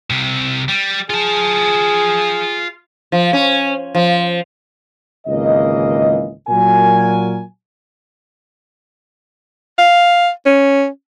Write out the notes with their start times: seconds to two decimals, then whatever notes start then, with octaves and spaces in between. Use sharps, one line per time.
0.10 C2 C3
0.69 G3
1.10 F4 G#4 A5
3.12 F3
3.33 C#4
3.95 F3
5.27 G#1 C#2 E3 A#3 D#5
6.48 A#2 F#3 F#4 A#4 G#5
9.78 F5
10.46 C#4